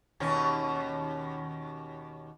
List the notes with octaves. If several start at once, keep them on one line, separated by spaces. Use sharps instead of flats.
D#2 B2 C#4